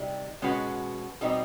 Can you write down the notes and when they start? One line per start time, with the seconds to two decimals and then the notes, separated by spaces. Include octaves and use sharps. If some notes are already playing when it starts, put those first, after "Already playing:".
Already playing: C3 G3 D#4
0.42 B2 G#3 C#4 F#4 B4
1.21 B2 G3 C4 D#4